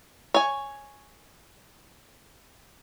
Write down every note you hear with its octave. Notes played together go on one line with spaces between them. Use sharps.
C#5 G#5